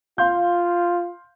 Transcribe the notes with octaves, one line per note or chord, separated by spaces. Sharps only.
F4 F5 C6 G6